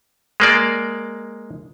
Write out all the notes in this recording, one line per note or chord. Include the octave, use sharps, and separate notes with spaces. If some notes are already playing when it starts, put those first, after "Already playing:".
G#3 A#3 D5